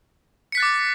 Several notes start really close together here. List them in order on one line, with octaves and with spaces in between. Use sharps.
C#7 B6 F#6 A6 D6